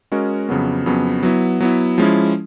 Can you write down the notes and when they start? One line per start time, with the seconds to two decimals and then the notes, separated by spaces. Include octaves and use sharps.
0.12 G#3 C#4 F#4 A#4 D#5
0.49 F2 C#3 F#3 B3
0.86 F2 C#3 F#3 B3
1.23 F#3 B3 E4
1.60 F#3 B3 E4
1.98 F3 G#3 C#4 E4